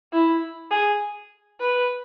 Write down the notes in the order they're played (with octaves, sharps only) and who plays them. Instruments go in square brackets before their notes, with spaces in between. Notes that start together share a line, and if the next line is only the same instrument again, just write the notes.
[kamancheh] E4
G#4
B4